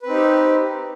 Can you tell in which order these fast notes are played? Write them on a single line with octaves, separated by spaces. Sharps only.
B4 C4 D#4 G4